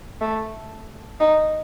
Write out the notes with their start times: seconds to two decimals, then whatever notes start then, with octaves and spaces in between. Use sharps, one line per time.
0.21 A3
1.20 D#4